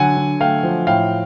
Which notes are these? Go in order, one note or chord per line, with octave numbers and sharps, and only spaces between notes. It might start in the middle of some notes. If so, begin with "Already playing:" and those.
Already playing: D3 F#3 F#5 G#5
D3
A3 F5 G5
F3
A2 F5 G5